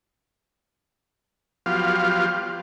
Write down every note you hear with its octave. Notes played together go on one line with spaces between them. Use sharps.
F3 F#3 B3 F4 G4 F5